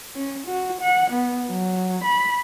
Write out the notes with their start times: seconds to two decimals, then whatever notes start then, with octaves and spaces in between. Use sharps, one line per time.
0.15 C#4
0.47 F#4
0.81 F#5
1.11 B3
1.51 F#3
2.04 B5